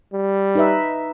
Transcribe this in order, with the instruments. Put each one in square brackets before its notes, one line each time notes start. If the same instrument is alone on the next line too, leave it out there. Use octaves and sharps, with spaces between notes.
[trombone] G3
[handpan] D#4 B4 E5